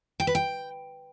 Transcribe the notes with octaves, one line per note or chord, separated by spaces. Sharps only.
G5
B4
G5